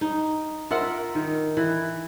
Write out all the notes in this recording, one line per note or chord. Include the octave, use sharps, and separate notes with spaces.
D#4
F4 A#4 E5 F#5
D#3
E3